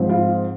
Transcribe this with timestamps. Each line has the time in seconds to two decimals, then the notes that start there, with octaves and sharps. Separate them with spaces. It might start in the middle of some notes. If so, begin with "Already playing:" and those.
Already playing: G#2 F3 G#3 C4
0.09 F4